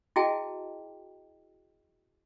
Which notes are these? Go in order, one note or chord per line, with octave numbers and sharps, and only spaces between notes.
E4 F#4 G#4 D#5 G5 A5